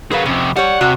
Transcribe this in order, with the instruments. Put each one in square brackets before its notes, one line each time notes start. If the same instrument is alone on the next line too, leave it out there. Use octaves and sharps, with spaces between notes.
[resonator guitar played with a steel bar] F#3 A#4 B4 [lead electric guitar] G#4 F5
[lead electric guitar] F2 C3 [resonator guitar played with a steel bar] C#4
[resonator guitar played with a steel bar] G3 C#5 [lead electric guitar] F#5
[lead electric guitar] C3 [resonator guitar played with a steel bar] F#4